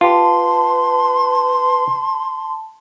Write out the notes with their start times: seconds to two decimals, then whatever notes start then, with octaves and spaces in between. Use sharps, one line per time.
0.01 F4 G4 B4 A5 C6